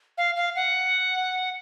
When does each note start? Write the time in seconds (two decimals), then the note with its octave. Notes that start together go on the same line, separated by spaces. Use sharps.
0.18 F5
0.36 F5
0.56 F#5